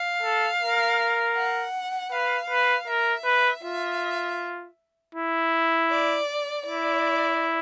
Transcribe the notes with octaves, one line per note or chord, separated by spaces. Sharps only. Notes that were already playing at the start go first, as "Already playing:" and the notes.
Already playing: F5
A4
A#4
F#5
B4 F5
B4
A#4 E5
B4
F4 E5
E4
D5
E4 D5